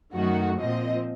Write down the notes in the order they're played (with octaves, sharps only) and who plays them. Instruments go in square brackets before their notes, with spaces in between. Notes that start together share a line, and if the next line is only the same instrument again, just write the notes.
[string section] F#2 D#3 A3 F#4
A#2 F3 C4 D#5